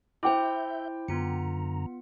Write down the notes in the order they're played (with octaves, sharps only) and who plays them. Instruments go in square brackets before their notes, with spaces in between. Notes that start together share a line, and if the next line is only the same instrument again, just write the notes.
[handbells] E4 C5 [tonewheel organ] E5 G6 [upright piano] G5 D6
[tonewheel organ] F#2 D3 A#5 [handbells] B3 F4 C#7